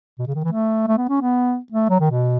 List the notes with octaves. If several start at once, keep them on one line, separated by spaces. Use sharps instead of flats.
B2
C#3
D#3
E3
A3
A3
B3
C#4
B3
A3
F#3
D#3
B2